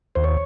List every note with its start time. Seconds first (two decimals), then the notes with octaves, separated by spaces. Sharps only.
0.15 D#2 C5
0.24 C#5